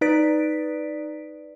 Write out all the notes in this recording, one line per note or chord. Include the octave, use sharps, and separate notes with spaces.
D#4 B4 D5 B6 D7